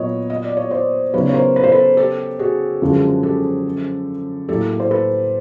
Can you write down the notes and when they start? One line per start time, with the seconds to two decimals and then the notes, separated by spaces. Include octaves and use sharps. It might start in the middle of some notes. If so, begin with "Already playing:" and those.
Already playing: A#2 F#3 B3 C#5 D#5
0.30 D#5
0.44 D5
0.57 C#5
0.70 C5 D5
1.13 C#3 F#3 B3 D#4 G4 B4 C#5
1.29 C#5
1.34 A#4 C5
1.56 B4
1.64 C5
1.71 A4 B4
1.97 G4 A4
2.39 F#4 G#4
2.82 F#2 D3 F3 G#3
3.23 G4 A4
4.49 A2 F#3 A#3 G4 A4
4.80 C5
4.91 A4 B4